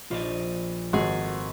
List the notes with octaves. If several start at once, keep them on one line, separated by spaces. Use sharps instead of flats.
A#1 F4 D5 D#5
G#1 F#4 G#4 A4